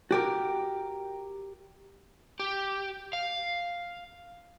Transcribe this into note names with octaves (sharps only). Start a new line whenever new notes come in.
F#4 G4 A#4
G4
F5